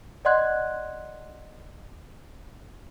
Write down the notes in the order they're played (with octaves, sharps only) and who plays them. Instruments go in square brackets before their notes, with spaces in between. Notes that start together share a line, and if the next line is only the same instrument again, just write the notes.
[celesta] D5 D#5 F#5 C6 F#6 G#6